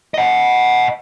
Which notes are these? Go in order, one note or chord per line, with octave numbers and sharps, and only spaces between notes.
D#5 F#5